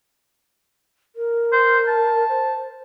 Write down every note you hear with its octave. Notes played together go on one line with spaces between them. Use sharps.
A#4
C5
A5
C5